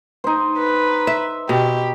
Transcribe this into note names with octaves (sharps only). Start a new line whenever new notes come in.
D#4 C5
B4
E5
B2 G4